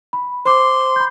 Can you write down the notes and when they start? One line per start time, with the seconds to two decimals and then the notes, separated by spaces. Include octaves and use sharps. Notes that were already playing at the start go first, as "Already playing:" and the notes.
0.13 B5
0.45 C5 C6 D6
0.96 B5 G6